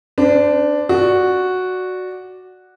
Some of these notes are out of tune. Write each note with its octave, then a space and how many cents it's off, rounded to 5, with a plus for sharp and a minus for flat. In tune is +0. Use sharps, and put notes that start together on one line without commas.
D4 +0 C5 -35
F#4 -5 D5 +0